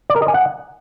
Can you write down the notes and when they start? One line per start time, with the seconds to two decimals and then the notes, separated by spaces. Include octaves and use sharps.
0.10 D5
0.16 A#4
0.22 D#5
0.28 G#5
0.34 F#5